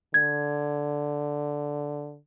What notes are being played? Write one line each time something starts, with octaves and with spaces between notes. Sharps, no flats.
D3 G#6